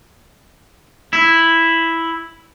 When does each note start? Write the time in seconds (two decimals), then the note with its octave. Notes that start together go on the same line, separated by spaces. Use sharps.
1.13 E4